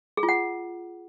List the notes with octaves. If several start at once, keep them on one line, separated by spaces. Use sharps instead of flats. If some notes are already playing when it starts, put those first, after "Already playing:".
G#4
F4
F#5